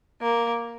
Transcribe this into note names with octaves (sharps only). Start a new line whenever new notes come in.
A#3